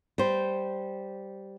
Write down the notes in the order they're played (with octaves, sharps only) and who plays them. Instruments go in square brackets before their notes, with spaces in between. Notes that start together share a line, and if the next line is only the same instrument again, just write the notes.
[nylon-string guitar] G3 C5